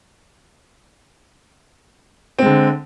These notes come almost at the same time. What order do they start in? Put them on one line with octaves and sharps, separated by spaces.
C4 G#3 D3